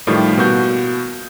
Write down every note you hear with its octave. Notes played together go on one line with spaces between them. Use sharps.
A2 D#3 F3 G3
B2 A#3 F#4 G6